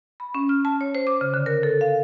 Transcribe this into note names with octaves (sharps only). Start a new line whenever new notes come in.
B5
C#4
F6
A5
C#5
C5
D6
C#3
D3
A#4
A4
F5